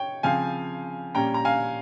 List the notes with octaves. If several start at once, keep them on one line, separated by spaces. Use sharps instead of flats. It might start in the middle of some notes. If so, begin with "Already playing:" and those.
Already playing: C#5 G5
C#3 F3 C4 F5 G#5
A#2 G3 C#4 G5 A#5
A#5
F5 G#5